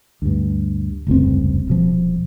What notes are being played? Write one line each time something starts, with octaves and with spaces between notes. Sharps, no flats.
D2 G2
F1 C#2 G2 C4
D#1 B2 F3